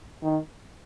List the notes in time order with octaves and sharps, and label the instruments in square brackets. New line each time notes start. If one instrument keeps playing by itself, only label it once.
[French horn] D#3